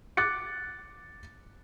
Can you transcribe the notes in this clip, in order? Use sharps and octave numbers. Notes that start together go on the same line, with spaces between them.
D6 F#6 A6 C#7